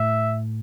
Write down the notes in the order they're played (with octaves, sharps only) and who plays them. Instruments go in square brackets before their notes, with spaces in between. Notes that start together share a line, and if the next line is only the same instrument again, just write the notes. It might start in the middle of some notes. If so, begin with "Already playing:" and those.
Already playing: [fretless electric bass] A2 [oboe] E5